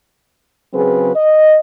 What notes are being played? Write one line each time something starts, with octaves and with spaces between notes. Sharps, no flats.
C#3 F#3 C4 G#4 B4
D#5